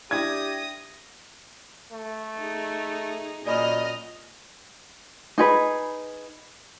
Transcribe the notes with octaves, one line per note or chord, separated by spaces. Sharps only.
D4 E4 G4 D#6 G#6 A#6
A3
D#4 G#4
F#2 A#2 D5 D#5 G#5 B5 F6
D#4 G#4 B4